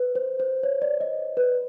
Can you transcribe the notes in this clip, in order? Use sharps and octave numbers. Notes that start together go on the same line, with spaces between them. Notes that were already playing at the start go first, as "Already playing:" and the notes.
Already playing: B4
C5
C5
C#5
D5
D#5
B4